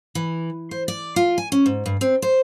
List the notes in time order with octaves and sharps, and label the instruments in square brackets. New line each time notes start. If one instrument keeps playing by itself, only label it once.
[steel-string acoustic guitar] E3
C5
D5
F4
G#5
C#4
G#2
G2
C4
C5